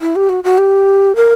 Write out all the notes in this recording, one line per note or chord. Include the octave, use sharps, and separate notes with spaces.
E4
G4
F#4
F#4
G4
A#4